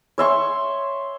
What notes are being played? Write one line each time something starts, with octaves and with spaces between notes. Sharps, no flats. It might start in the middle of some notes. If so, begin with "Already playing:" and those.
C#5 E5 C6 C#6